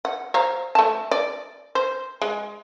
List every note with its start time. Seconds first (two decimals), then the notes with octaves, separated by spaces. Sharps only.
0.05 F#5
0.34 C5 F5 A#5
0.75 A3 A5
1.11 D5
1.75 C5
2.22 G#3